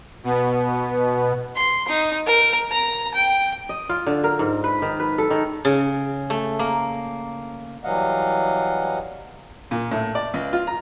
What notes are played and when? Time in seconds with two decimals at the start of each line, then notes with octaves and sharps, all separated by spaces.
0.24 B2 B3
1.55 C6
1.88 D#4
2.26 A#4
2.71 A#5
3.14 G5
3.69 D#5
3.89 F4
4.06 D3
4.24 A#4
4.39 G#2
4.64 B4
4.82 D#3
5.00 B4
5.18 A4
5.30 D#3
5.65 C#3
6.30 A3
6.59 A#3
7.84 E3 F#3 G3 D#5 F5 F#5
9.71 A#2
9.91 A2
10.15 D5
10.34 C#2
10.53 F4
10.67 A#5